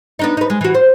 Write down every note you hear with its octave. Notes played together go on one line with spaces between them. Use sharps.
B3 D4 D#4
D#4 B4
G#3
E3 F#4
C5